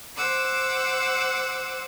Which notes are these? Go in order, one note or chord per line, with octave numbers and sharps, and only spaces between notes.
C5 F#5 D6 E6